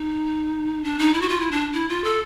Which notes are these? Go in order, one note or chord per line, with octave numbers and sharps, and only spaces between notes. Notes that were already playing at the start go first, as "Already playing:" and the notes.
Already playing: D#4
D4
D#4
E4
F#4
F4
E4
D4
E4
F4
A4